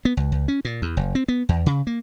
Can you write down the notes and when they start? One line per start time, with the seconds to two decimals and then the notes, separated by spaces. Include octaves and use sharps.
0.05 B3
0.17 C#2
0.32 C#2
0.48 C#4
0.65 A#2
0.82 E2
0.97 F#1
1.15 C4
1.28 B3
1.49 E2
1.66 C#3
1.87 A#3